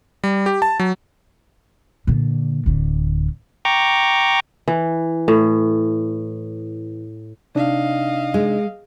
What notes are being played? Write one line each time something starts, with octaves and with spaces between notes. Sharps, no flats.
G3
G4
A5
F#3
A#2 D3
D1 D3
G5 A#5 C#6 D6
E3
A2
C3 D4 D#4 D#5 F5
G#3